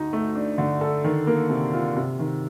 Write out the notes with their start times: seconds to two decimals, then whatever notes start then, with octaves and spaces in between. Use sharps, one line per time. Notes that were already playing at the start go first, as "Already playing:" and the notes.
Already playing: D2 D#4
0.13 A3
0.35 D4
0.58 D3
0.81 A4
1.04 D#3
1.27 A#3
1.50 C3
1.73 F4
1.97 C3
2.19 D#3